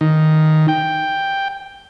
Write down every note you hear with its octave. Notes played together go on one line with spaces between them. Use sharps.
D#3
G5